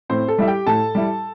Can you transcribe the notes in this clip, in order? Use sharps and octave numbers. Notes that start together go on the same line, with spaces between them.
A2 C4 C5
A4
G3 E4 E5
G4 G5
A2 A4 A5
G3 E4